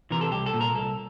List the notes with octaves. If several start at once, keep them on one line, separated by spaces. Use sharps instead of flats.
C3 E3 A#4
A4
C2 G4
A4
A#2
A#4
C2 A4